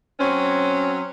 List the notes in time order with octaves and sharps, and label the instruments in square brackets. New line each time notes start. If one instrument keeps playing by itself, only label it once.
[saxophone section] F#3 C4 C#4